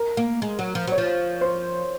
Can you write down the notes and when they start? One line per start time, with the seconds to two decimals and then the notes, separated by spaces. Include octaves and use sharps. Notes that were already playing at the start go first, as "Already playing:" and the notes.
Already playing: A#4
0.17 A#3
0.42 G#3
0.59 F#3
0.75 F3
0.87 F#3 C#5
0.98 F3
1.41 C5